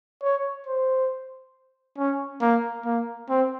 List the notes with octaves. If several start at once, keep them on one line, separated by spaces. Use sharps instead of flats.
C#5
C5
C#4
A#3
A#3
C4